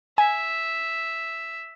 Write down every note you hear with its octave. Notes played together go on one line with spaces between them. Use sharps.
E5 G#5